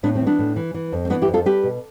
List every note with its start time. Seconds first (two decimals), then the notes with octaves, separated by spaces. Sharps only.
0.03 A2 B3 D4
0.15 C4
0.21 E3
0.26 B3 D4
0.39 A2
0.56 E3
0.74 E3
0.92 F2
1.05 C4
1.10 E3 B3 D4
1.22 E4 G4
1.28 F2
1.34 F4 A4
1.45 G3 G4 B4
1.64 B2